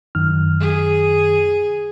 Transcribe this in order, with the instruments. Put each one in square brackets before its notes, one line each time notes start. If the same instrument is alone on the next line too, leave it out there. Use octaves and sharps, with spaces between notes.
[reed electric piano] F#2 D#3 F6
[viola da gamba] G#4